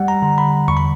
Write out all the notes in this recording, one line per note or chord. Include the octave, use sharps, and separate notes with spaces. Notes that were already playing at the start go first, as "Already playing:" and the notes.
Already playing: G3 F#5
A#5
D3
B5
E2 C#6
B5